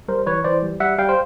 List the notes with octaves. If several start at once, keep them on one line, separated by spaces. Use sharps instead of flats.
G3 A#4 C5
E3 B4 C#5
E3 C5 D5
G3
G3 E5 F#5
G3 F5 G5
C5